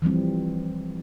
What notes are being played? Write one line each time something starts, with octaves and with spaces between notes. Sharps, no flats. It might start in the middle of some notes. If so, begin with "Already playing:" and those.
E3 F3 G3 C4